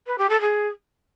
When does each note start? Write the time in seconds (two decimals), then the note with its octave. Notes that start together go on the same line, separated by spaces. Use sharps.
0.07 B4
0.18 G4
0.29 A4
0.41 G#4